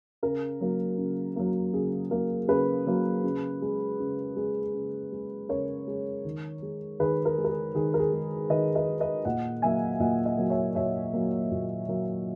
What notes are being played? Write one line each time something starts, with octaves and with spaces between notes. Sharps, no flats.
C#3 A#4
F#3 A#3
C#3
F#3 A#3
C#3 G#4
F#3 A#3 A#4
C#3 G#4 B4
F#3 A#3
C#3
G#3
C#3
G#3
C#3
G#3
C#3 A#4 C#5
G#3
D#3
G#3
D#3 G#4 B4
A#4
G#3
A#4
G#4
D#3 G#4
A#4
G#4
G#3
D#3 B4 D#5
B4 D#5
G#3
B4 D#5
A#2 D#5 F#5
F#3 A#3 E5 G#5
A#2 D#5 F#5
D#5 F#5
F#3 A#3
C#5 E5
A#2 C#5 E5
F#3 A#3
A#2
F#3 A#3